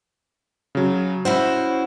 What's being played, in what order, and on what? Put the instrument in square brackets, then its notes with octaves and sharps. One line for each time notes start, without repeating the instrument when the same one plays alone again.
[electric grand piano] C#3 F#3
[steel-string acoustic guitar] C#4 E4 F#4 [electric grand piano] C5